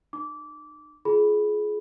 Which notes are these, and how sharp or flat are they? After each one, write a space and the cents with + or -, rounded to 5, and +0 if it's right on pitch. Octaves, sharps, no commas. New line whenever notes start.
D#4 -40 D6 -20
F4 -15 G#4 +25 B5 +0